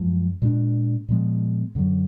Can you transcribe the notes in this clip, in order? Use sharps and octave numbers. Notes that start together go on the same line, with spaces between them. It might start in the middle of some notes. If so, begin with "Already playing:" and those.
Already playing: F#2 F3 G#3
A#2 G#3 D4
A#2 F3 G#3 B3
F#2 D3 F#3